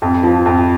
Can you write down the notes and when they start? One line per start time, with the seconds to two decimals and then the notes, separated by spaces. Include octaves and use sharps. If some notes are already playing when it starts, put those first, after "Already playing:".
0.02 F2
0.23 F3
0.46 F2